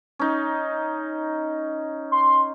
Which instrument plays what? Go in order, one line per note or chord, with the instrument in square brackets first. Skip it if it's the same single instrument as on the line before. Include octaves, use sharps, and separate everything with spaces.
[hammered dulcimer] C#4 D#4
[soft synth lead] C6